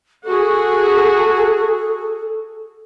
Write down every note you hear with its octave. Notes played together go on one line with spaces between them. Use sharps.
F#4 G#4 A4